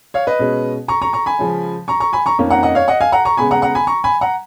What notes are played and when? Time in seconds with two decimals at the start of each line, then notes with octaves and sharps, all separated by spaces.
0.14 C#5 F5
0.27 B4 D#5
0.39 B2 G#3 C#4
0.88 A#5 C#6
1.02 A#5 C#6
1.13 A#5 C#6
1.26 G#5 B5
1.39 C#3 F3 G#3 C#4
1.88 A#5 C#6
2.00 A#5 C#6
2.13 G#5 B5
2.26 A#5 C#6
2.38 F2 D#3 A#3 C#4
2.50 F#5 A#5
2.63 D#5 F#5
2.75 C#5 F5
2.88 D#5 F#5
3.01 F5 G#5
3.12 F#5 A#5
3.25 A#5 C#6
3.37 C#3 G#3 B3 G#5 B5
3.51 F#5 A#5
3.62 F#5 A#5
3.75 G#5 B5
3.87 A#5 C#6
4.04 G#5 B5
4.21 F#5 A#5